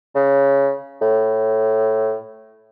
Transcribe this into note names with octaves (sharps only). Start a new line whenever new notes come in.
C#3
A2